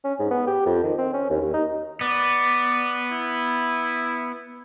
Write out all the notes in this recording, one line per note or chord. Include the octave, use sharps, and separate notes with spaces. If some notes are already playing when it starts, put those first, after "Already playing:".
C#4
G#2
B3
G4
F2
D#3
C4
C#4
D#2
D#2
D#4
B3 D5
E4